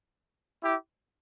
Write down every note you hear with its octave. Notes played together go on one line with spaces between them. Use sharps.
E4 G4